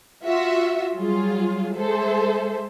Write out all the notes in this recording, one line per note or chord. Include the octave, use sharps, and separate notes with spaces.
F4 F#4 E5
F#3 G3 F4 G#4
G#3 G#4 A4 C5 E5